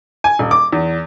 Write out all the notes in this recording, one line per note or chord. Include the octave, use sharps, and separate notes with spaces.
G#5
D#1
D6
E2